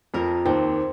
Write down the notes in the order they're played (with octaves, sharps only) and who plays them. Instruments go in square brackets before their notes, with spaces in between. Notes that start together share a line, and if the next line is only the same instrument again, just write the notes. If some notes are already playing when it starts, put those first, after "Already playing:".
[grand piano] F2 F3 [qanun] A#4
[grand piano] D#2 D#3 [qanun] C4